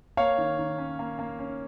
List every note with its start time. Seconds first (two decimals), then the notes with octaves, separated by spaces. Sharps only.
0.17 A#3 C#5 F5
0.38 D#3
0.59 D#3
0.78 C#4
0.99 A#3
1.19 A#3
1.39 C#4